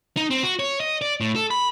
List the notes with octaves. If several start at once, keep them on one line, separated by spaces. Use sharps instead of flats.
D#4
C4
F#4
C#5
D#5
D5
A2
A4
B5